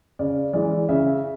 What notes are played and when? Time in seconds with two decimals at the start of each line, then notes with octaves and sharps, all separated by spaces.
0.19 C#3 D5
0.53 E3 G#3 D5
0.89 C#3 E5